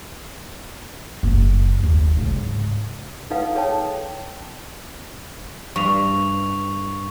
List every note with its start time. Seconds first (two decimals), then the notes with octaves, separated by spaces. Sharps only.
1.23 F#1
1.83 D#2
2.17 G#2 C#3
3.30 D#4 A4 B4 F5 F#5
3.55 G#4 A4 C#5 G5 A5
5.76 G2 C#6 F7